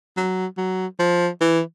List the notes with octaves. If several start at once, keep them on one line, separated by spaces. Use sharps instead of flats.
F#3
F#3
F3
E3